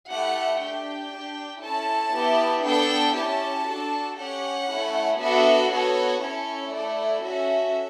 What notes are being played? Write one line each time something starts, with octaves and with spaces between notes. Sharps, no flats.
A3 E4 G4 F#5
D4 G4 G5
D4 G4
C#4 E4 A4 A5
B3 E4 G4
B3 D4 A4 G5
C#4 E4 G4 A5
D4 F#4 A4
C#4 G4 F#5
A3 C#4 E4 A4
B3 D4 F#4 A4 E5
B3 F#4 A4 C#5
C#4 E4 A4 C#5
A3 E4 A4 D5
C#4 F#4 A4 E5